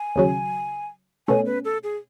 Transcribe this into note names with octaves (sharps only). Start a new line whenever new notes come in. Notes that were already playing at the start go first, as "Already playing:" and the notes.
Already playing: G#5
D#2 C#3 F#3
B2 A3 C#4 G#5
B4
A4
G#4